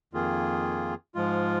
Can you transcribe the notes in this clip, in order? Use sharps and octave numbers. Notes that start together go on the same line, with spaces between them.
F2 D#3 A#3 F4 G#4
G#2 F3 G#3 F4